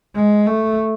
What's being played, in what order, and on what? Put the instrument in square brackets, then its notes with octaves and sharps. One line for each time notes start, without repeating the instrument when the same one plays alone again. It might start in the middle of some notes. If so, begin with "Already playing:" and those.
[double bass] G#3
A3